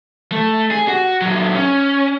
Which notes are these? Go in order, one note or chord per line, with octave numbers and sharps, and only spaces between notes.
A3
G#4
F#4
A#2 F#3
C#4